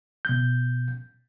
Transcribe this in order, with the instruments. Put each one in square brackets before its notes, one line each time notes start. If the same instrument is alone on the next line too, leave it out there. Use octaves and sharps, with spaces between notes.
[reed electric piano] B2 G6